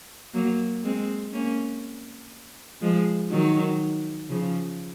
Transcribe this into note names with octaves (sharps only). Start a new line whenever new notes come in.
F#3 A#3
G#3 C4
A#3 C#4
F3 G#3
D#3 F#3
C#3 F3